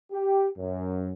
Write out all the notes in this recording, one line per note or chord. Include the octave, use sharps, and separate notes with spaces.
G4
F#2